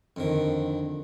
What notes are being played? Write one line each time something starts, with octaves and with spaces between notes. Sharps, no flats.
F2 D3 D#3